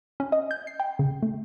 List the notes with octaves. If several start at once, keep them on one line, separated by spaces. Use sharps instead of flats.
C#4
D#5
G6
C7
G5
C#3
A3